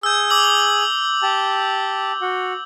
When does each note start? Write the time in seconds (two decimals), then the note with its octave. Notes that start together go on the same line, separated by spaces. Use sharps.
0.03 G#4 E6 G6
0.30 D6 E6 F#7
1.22 G4 A5
2.22 F#4